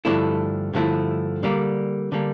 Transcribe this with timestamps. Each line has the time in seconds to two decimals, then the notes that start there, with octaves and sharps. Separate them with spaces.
0.05 G2 D3 F3 A3 E4
0.73 G2 D3 F3 A3 E4
1.43 D3 G3 A#3
2.12 D3 G3 A#3